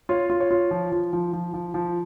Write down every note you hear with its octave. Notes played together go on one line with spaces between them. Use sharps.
F4 C#5
F4
C#5
F4
F3
F3
F3
F3
F3
F3